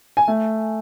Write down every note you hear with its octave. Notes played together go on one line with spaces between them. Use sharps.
G#5
A3